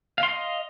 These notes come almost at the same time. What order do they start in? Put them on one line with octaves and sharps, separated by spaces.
F5 C6 D#5